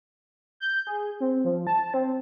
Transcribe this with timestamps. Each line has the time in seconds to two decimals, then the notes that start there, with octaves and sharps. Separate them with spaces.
0.60 G6
0.87 G#4
1.20 C4
1.45 F3
1.67 A5
1.94 C4